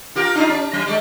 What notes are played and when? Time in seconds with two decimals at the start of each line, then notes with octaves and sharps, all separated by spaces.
0.15 F4 G4 A#4
0.35 D4 D#4 F4
0.49 C#4
0.73 F#3
0.86 G3 G#3